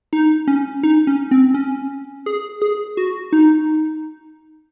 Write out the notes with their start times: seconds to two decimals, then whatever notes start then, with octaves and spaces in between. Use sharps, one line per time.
0.13 D#4
0.48 C#4
0.83 D#4
1.07 C#4
1.31 C4
1.54 C#4
2.26 G#4
2.62 G#4
2.97 F#4
3.33 D#4